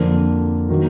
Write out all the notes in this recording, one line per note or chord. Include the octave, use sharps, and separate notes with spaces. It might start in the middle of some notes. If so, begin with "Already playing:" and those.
Already playing: F2 D3 F3 A#3 D4
D#3 F#3 A#3